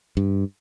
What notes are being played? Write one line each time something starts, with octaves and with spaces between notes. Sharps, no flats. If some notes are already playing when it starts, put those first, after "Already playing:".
G2